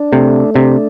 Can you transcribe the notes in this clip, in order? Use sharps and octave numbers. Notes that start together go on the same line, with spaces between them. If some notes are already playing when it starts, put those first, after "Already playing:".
Already playing: D4
C3 A3
C3 D4